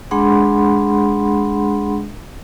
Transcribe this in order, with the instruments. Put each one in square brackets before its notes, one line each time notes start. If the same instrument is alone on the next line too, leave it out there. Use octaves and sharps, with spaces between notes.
[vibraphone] G#3 D4 G#4 F#5 B5 C6